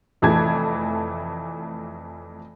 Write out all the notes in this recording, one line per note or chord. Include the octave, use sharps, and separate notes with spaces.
F1 F2 E3 A3 A5 G#6